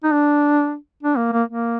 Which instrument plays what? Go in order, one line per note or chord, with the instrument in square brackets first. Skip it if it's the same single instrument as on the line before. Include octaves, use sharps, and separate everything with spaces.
[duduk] D#4
D4
D4
A#3
A#3
A#3